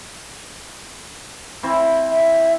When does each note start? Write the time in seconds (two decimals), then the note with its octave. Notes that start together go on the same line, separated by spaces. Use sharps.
1.63 E3 C4 E4
2.11 E5